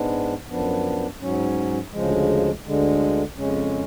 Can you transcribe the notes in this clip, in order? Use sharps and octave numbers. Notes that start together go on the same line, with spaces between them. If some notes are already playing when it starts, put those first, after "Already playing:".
Already playing: G#2 G#3 B3 D4
F#2 F3 B3 D4
G#2 F#3 C#4
D2 C#3 F3 G#3
D2 D3 G#3
F2 C#3 G#3 C#4